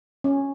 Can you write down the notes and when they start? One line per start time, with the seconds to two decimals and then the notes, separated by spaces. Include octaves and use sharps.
0.24 C#4